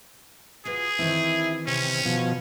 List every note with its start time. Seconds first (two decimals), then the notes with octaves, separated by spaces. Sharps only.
0.65 F4 F#4 G#4 B4
0.99 D#3 E3 C4 E4
1.67 C3 C#4
2.05 B2 F3